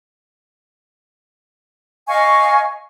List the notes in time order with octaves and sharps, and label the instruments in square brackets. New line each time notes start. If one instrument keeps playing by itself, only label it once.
[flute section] D#5 F5 G#5 C#6